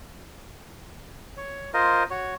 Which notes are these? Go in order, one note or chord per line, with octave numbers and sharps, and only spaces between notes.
C#5
F4 A#4 C5 D#5
F#4 C#5